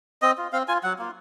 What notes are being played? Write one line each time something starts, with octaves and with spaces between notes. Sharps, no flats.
C4 D#5
F4
C4 F5
F4 G#5
F#3 F#5
A#3 F4